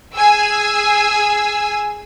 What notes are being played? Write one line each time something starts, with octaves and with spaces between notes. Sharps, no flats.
G#4 G#5 E6